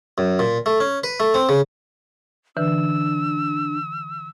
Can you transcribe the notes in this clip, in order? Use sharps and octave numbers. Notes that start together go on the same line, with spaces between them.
F#2
A#2
A3
C#4
B4
A3
C4
C#3
D3 E3 D4 B4 E6